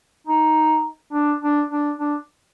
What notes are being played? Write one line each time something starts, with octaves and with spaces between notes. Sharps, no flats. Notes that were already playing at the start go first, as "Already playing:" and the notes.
D#4
D4
D4
D4
D4